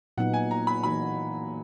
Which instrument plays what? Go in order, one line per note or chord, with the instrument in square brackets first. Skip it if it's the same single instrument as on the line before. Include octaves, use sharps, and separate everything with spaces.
[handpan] A#2 F#3 B3 D#4 [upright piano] F#5
[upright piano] G#5
A#5
B5
[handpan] E3 A#3 D#4 F#4 [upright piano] B5